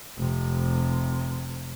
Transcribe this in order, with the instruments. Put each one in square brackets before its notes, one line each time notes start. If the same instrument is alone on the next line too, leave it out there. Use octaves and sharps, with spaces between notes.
[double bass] F1 C3